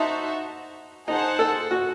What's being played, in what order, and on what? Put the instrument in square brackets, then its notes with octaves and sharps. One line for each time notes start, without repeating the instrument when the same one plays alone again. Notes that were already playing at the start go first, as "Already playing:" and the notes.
Already playing: [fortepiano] D#4 [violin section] F#4 C5 E5 A5
[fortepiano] D#4 [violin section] G#4 C5 F#5 A5
[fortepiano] A4
F#4